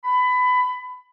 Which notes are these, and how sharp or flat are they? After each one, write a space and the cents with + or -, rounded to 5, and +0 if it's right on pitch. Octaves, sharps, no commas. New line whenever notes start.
B5 +20